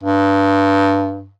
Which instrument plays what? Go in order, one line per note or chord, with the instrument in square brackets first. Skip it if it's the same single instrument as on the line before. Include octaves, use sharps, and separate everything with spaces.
[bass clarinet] G2